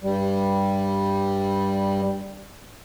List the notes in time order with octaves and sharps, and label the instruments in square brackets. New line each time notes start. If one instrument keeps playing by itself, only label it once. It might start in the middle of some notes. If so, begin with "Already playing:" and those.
[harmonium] G2 G3